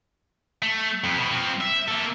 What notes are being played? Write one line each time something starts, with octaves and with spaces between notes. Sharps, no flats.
A3
F2
B2
F3 C4
E5
A#3 A4